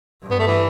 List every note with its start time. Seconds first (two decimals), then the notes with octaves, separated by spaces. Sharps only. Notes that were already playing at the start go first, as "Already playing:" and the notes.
0.22 G2
0.31 B3
0.39 A3
0.47 E3